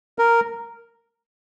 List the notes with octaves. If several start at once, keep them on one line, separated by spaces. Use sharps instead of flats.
A#4